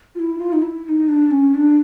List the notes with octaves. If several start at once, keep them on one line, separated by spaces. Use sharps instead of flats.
F4
E4
F4
D#4
E4
E4
D#4
D4
C#4
D4